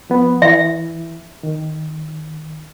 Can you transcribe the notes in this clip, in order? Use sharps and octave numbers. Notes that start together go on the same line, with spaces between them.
F3 B3
E3 E5
D#3